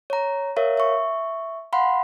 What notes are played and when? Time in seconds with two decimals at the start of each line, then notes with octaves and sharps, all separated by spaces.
0.10 C#5 A#5
0.56 A#4 C#5 E5 F5
0.77 E5 C#6
1.73 F5 F#5 B5 C6